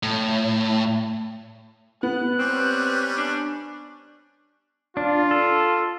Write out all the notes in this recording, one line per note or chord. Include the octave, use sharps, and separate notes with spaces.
A2
B3 F#6
G3 C4 C#4 D6
D4
D4 F4
A4